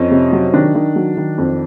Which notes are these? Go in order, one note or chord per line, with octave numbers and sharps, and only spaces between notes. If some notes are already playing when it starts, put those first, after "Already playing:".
Already playing: F2 C#4 D#4
C3
F#3
D#3 D4
D#3
F#3
D#3
F2